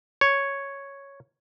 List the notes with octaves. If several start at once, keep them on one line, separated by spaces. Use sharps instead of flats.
C#5